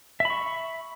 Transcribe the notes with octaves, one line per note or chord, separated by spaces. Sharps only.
E5 B5 C#6